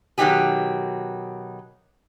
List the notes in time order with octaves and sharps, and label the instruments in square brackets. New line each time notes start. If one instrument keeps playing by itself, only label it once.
[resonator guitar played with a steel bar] B2 D#3 F#3 D#4 G4 G#4